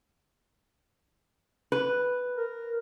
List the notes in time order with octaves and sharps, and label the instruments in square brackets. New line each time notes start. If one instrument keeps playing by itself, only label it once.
[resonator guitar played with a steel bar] B4
[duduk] A#4